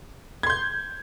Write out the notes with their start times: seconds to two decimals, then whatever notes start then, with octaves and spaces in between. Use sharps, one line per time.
0.43 G#6
0.47 C6
0.50 G6